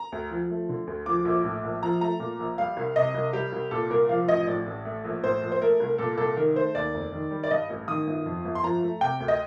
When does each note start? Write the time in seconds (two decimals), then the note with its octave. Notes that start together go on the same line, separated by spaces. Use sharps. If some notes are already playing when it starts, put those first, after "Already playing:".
Already playing: A#5
0.12 D2
0.31 F3
0.50 A3
0.69 D3
0.87 D2
1.06 F3 D6
1.25 A#1
1.44 A2
1.63 A#1
1.83 F3 A#5
2.01 A3 A#5
2.20 A#2
2.39 A#1
2.58 G3 F5
2.77 C2
2.96 C3 D#5
3.14 C2
3.33 G3 G4
3.53 C2
3.71 A#2 A4
3.90 C2 A#4
4.09 F3 F5
4.28 A1 D#5
4.47 A2 D5
4.66 A1
4.85 A3
5.05 A#1
5.23 A2 C5
5.42 A#1
5.52 C5
5.61 A3 A#4
5.80 C2
5.98 A#2 A4
6.17 C2 A4
6.37 D#3 A#4
6.56 A3 C5
6.75 D#2 D5
6.94 F1
7.12 D#3
7.31 G3
7.44 D5
7.50 G2 D#5
7.70 A1
7.88 D#3 D#6
8.07 G1
8.26 F2
8.45 G1
8.55 C6
8.63 F3 A#5
8.83 A3
9.01 C3 G5
9.20 D2
9.28 D#5